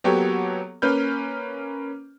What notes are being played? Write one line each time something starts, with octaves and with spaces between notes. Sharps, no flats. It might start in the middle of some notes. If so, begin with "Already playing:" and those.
F#3 A#3 B3 G4 A4 C#5
A#3 C#4 B4 F6 G6